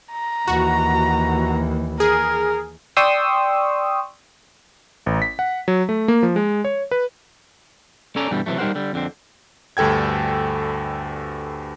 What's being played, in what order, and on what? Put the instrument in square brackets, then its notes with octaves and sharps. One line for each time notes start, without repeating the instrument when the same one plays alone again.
[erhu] A#5
[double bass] D#2 E3 [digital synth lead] F#4
[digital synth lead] G#4 [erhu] A#4
[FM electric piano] D5 G5 C6 C#6 D#6 E6
[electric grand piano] A1
B6
F#5
F#3
A3
A#3
F3
G#3
C#5
B4
[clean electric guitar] C#4 A4 C#5 D5 G#5 A#5
G2 B2 D3 E3 G3
C3 E3 F#3 A3
G3 D#4 G4 A#4 C5 F#5
D3 G3
F2 D3 C4
[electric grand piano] D2 G2 A4 G5 G#6